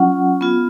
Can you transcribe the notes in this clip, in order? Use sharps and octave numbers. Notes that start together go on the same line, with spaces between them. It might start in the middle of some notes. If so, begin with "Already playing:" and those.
Already playing: F#3 C#4 F4 F#5
B3 F4